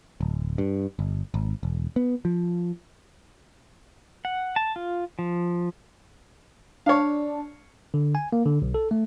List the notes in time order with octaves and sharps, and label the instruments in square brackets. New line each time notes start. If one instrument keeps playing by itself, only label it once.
[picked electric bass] D1
G2
G1
G#1
E1
B3
F3
[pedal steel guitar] F#5
A5
F4
F3
[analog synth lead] D4 [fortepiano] C#5 F5
[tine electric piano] D3
G#5
A#3
D3
B1
A4
A3